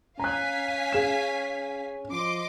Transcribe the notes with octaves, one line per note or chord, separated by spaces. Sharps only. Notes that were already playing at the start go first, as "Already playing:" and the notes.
C#4 F5 G#5 A#5 F#6 B6
G#4 E7
F3 D#5 C6 D6